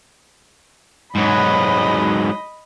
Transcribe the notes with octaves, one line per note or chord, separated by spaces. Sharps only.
G#2 F#3 D#5 B5